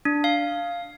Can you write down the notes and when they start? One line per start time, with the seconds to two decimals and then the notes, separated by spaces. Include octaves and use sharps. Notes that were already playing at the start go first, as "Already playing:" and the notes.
0.05 D4
0.24 F5